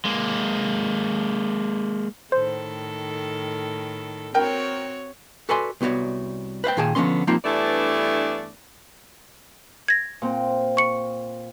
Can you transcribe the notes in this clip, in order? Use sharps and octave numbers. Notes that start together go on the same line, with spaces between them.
G#3 A#3
A2 D#3 A4 C5
C4 F#4 A#4 C#5 G5
F#4 A4 B4 D5 G#5 C6
C2 B3 F#4 C#5 D5
B4 C5 F5 G5
A#2 D#3 G#4 G5 A5
D3 F3 B3 C#4 C6
F3 G3 A#3 C4 D#4 F4
G2 E3 A3 B3 D4 D5
G#6 A#6
A#2 C4
C#6 C#7